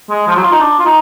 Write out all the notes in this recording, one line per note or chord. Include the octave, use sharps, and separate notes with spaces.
G#3
F3
F#3
F4
D#4
D4
F4
D#4